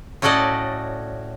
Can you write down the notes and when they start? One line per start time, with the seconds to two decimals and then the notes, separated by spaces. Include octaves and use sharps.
0.22 A2 C#4 F#4 A4 D5 D#5